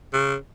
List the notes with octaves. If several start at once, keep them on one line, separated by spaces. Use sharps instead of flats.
C#3